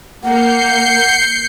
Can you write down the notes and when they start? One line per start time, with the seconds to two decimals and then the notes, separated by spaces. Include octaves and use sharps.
0.24 A#3 F#5 G6 C7 C#7